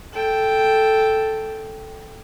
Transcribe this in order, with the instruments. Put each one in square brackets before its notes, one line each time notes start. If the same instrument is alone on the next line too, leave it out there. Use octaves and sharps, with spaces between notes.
[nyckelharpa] A4 G5